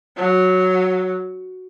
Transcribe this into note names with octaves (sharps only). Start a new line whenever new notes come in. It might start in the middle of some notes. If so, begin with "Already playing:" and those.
F#3